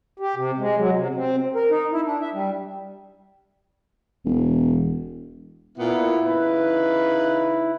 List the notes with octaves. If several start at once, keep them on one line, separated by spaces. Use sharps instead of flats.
G4
C3
G#3
F#3
C3
C4
A#4
D#4
E4
D4
E5
G3
E1
A#2 B3 E4
C#3 D#4 B4